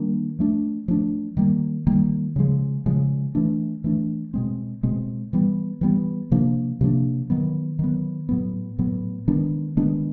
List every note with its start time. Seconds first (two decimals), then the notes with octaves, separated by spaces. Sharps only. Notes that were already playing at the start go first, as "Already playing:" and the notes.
Already playing: D#3 G3 A#3 D4
0.39 F3 A3 D4
0.88 F3 A3 D4
1.37 D#3 G3 A#3
1.87 D#3 G3 A#3
2.36 C#3 F3 G#3
2.86 C#3 F3 G#3
3.35 E3 A3 D4
3.84 E3 A3 D4
4.34 B2 G#3 C4
4.83 B2 G#3 C4
5.33 E3 G3 B3
5.81 E3 G3 B3
6.31 C3 F3 A#3 D4
6.81 C3 F3 A#3 D4
7.30 D#3 F#3 B3
7.79 D#3 F#3 B3
8.29 A2 F#3 B3
8.79 A2 F#3 B3
9.28 D#3 G#3 B3 D4
9.77 D#3 G#3 B3 D4